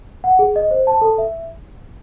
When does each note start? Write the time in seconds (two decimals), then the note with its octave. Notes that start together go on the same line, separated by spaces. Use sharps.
0.24 F#5
0.39 G#4
0.56 D#5
0.71 C5
0.87 A5
1.01 A4
1.18 E5